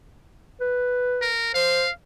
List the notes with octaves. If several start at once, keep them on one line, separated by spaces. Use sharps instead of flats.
B4
A#4
C5 F5